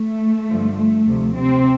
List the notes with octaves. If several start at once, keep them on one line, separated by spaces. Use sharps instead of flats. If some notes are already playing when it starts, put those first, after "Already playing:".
Already playing: A3
G2 D3 F3
A3
D2 C3 F3
C3 C4